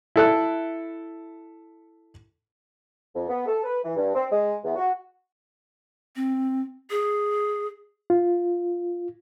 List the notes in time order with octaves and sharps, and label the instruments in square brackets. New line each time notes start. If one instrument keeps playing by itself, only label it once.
[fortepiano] E4 A4 F#6
[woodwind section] F2
B3
A4
B4
E3
G2
C4
G#3
E2
F#4
[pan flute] C4
G#4
[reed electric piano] F4